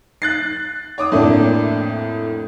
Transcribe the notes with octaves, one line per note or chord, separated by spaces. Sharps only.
F#6 A6 C7
C#5 D6 D#6
F2 A2 D3 A3 A#3 D4